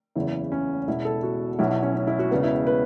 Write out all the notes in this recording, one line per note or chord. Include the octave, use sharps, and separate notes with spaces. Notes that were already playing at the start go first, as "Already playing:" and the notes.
F#1 E2 C#3 E3 E4
C#4
E1 E2 B2 E4
A4
F#4
B1 B2 E4
E4
C#4
C#4
E4
F#4
E1 E2 C#3 B3
E4
B4